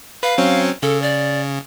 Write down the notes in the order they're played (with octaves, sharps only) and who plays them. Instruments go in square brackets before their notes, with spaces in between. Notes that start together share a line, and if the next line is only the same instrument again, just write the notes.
[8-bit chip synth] B4 [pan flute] F5
[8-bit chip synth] F#3 C4 C#4
[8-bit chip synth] C#3 [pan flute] A4
[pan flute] D5